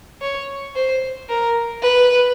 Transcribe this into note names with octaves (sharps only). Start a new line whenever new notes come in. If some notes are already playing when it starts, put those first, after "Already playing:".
C#5
C5
A#4
B4